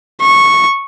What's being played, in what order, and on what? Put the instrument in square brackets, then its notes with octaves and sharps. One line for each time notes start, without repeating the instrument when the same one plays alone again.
[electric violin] C#6